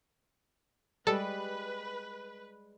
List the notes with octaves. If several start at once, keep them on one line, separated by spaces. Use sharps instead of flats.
G3 G#3 A4 B4